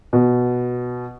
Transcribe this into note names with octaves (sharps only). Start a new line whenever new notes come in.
B2